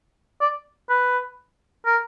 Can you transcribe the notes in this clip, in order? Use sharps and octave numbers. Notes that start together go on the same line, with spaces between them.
D5
B4
A#4